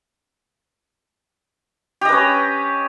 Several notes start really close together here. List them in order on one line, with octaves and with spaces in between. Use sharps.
G4 D#5 B4 C#4